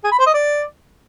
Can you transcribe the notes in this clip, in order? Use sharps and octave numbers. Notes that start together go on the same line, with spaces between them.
G#4
B5
C5
D#5
D5